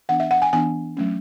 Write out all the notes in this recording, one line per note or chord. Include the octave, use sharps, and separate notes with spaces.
E3 B3 D4 F#5
E5
F#5
G#5
E3 B3 D4 G#5
F#3 A3 C#4